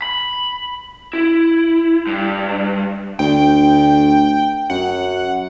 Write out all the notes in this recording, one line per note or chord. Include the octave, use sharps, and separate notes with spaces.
B5
E4
G2
D2 G5
F#2 F#5